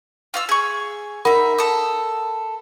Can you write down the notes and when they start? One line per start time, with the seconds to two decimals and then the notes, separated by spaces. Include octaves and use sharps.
0.34 F4 F5 E6
0.49 G#4 C#6
1.25 D#4 A#4 E5 F#5 B5
1.58 A4 D#6